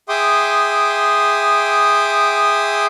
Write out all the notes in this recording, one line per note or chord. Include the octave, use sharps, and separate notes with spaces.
G#4 E5 G5 C6 D6 D#6